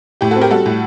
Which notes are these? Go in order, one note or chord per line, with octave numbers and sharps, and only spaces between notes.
A2 G4
F#4 A4
C4
G4 A#4
G3 F#4 A4
A2